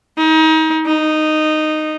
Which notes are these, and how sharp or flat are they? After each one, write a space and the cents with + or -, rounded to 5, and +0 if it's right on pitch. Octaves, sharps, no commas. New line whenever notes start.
D#4 +30
D#4 -10